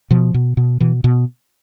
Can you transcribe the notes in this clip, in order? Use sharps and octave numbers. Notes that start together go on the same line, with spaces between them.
B2 F3
B2
B2
B2 E3
B2